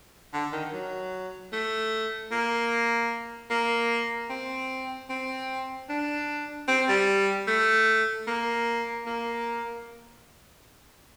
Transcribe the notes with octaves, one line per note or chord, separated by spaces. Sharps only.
D3
D#3
F#3
A3
A#3
A#3
C4
C4
D4
C4
G3
A3
A#3
A#3